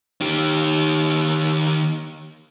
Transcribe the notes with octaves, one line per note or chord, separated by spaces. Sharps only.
D#3 G4